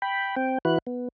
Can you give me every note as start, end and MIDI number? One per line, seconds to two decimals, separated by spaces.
0.02 0.35 79
0.02 0.35 83
0.36 0.58 60
0.36 0.58 79
0.65 0.78 52
0.65 0.78 64
0.65 0.78 66
0.65 0.78 71
0.65 0.78 90
0.87 1.08 59